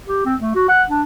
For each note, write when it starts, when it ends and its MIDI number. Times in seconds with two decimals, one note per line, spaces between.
0.07 0.21 67
0.25 0.34 60
0.40 0.54 57
0.55 0.67 66
0.68 0.83 78
0.89 1.02 62